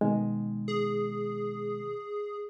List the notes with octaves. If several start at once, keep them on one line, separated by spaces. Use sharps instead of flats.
B2 D#3 G#3
G#4